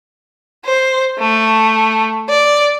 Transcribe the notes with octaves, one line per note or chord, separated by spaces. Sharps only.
C5
A3
D5